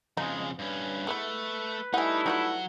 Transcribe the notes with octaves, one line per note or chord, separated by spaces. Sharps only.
F2 C#3 G#3 D#4
G2 C#4 B4
G#3 A3 B3 E4
G3 A3 D#4 E4 F#5 G#5
F#3 D#4 F4 F#4 F#5